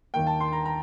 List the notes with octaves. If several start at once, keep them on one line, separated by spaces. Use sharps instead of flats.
D#2 D#3 A#3 G5
A5
C6
A#5
A#5